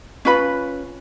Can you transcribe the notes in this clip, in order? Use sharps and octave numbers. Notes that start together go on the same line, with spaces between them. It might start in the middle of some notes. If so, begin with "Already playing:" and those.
C#4 F4 B4 B5